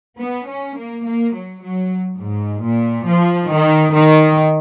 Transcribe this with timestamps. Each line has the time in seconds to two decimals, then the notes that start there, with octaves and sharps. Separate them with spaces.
0.19 B3
0.48 C#4
0.77 A#3
1.05 A#3
1.35 F#3
1.62 F#3
2.20 G#2
2.64 A#2
3.07 F3
3.50 D#3
3.94 D#3